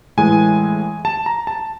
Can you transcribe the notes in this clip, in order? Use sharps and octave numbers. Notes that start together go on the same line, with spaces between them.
A2 E3 G#3 G#5
A5
A#5
A5